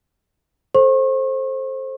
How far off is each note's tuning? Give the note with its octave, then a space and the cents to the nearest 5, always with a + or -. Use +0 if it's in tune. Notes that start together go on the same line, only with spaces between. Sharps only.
A4 -10 C5 +15 C#6 -40